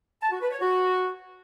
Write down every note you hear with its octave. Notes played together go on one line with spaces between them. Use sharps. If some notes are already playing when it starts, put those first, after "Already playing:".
A5
F#4
B4
C#5
F#4